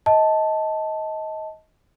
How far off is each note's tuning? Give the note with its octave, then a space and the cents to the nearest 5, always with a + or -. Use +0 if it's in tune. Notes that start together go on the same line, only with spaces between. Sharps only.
D#5 +20 A5 +0